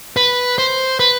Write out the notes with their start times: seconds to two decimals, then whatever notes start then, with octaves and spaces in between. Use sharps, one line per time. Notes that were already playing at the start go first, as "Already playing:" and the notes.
0.17 B4
0.58 C5
1.00 B4